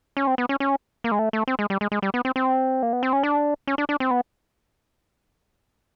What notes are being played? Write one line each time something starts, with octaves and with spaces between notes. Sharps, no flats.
C#4
C4
B3
C#4
C#4
A#3
G#3
A3
A3
C4
G#3
G3
G#3
G#3
G3
B3
C4
C4
A#3
B3
C4
C#4
D4
C#4
D4
D4
C4
B3